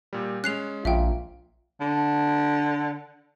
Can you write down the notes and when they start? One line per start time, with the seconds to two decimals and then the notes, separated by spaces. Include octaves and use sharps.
0.13 A#2 G3
0.44 G#3 C#4 F#6 C7 F7
0.85 A#1 F4 E5 G5
1.81 D3